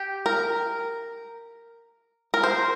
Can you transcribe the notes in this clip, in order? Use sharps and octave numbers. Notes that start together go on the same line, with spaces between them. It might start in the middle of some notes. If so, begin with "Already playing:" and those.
Already playing: G4
A#4
A#4
C5